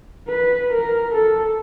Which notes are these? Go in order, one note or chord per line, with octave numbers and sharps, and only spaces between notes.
B4
A#4
A4